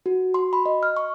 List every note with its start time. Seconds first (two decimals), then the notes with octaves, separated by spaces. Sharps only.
0.06 F#4
0.34 C6
0.53 B5
0.66 D#5
0.83 F6
0.97 C#6